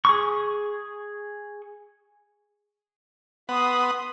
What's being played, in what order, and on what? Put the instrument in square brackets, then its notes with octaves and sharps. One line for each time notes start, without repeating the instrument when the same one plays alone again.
[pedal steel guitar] G#4 C#6
[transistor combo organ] B3 F#5 [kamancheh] C6 D#6